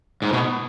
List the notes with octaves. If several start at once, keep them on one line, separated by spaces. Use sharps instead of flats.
G#2
B2